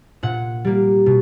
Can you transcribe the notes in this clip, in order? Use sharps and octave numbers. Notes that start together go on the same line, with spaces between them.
A#2 F#5
G3 A#3
B2